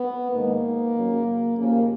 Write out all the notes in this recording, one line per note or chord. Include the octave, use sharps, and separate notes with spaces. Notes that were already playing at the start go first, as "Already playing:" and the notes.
Already playing: B3
G#2 D#3 G#3 A#3
F#2 C#3 F#3
D#2 C#3 F3 A#3